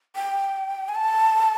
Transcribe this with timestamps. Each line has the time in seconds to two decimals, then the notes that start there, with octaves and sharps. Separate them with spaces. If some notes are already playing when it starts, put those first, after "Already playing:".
0.15 G5
0.89 G#5
0.95 A5